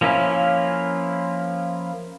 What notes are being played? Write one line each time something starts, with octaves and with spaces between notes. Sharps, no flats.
F3 A#3 C#4 E4 F4